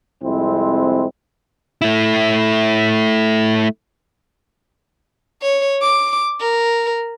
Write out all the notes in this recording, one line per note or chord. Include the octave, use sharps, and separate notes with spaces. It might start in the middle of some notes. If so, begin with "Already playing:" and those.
C2 F2 G#3 C4 E4
A3 E4
C#5
D6
A#4